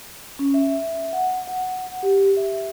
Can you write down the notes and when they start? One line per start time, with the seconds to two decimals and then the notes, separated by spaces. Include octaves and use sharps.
0.39 C#4
0.54 E5
1.13 F#5
1.48 F#5
2.03 G4
2.37 E5